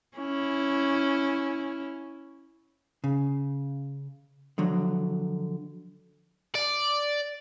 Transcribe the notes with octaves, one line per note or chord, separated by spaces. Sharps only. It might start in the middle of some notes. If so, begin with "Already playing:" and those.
C#4 E4
C#3
D3 F3 F#3
D5